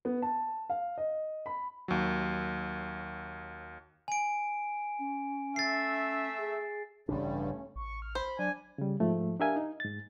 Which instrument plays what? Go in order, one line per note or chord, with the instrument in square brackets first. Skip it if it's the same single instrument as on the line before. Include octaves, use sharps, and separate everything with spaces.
[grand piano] B3
A5
F5
D#5
B5
[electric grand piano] D#2 F#3
[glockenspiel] G#5 D7
[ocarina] C#4
[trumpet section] A3 E5 [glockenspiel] A6 C7
[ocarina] G#4
[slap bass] A1 C#3 D4 [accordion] G2 G3 [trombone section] A3 C#4
[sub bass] A1 [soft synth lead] C#6
[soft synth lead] F6
[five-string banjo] C5 [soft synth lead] B5
[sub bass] F#3 [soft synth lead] D4 [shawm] G#5
[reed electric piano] C#3 G3
G#2 F3 A3
D4 G4 A#4 E5 F5 G#5
D#4
G#2 A6